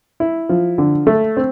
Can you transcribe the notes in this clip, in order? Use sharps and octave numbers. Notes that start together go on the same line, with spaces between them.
E4
F3
D3
A3
C4